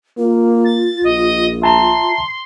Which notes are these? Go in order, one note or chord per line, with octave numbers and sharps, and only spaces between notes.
A#3 F4
A6
A#1 D#5
E5 A5 A#5 C6